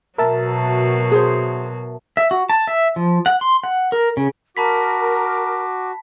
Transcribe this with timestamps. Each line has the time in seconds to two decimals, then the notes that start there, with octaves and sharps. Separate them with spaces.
0.18 B2 F#3 A#4 E5 A5
1.11 G#4 C5
2.17 E5
2.31 F#4
2.50 A5
2.67 E5
2.96 F3
3.26 F#5
3.41 C6
3.64 F#5
3.92 A#4
4.17 C#3
4.57 F#4 A#4 A5 B5 D6 B6